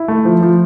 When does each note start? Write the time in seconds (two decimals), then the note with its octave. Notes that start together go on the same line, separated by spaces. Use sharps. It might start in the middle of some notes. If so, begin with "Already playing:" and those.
Already playing: E4
0.08 A3
0.25 F3
0.42 F3